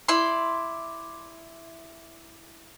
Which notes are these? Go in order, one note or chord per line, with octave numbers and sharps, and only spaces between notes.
E4 D5 C6